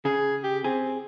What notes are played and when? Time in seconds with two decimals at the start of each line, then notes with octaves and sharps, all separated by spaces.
0.05 C#3 G#4
0.43 G4
0.64 C4 G#4